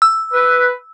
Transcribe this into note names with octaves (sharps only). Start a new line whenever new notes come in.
E6
B4